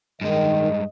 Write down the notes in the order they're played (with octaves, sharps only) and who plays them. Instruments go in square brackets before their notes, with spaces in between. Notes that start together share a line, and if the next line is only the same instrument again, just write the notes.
[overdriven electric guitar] G2 G#3 [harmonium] D#3 [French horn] D#5